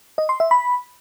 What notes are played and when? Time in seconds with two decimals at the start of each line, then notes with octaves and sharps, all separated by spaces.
0.18 D#5
0.29 C6
0.40 E5
0.51 B5